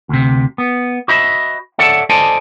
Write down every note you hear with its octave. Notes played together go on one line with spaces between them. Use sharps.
D2 C3
B3
F#4 C5 D#5 E5 B5
A4 C#5 D5 E5 F#5
A4 C5 D5 D#5 G#5 A5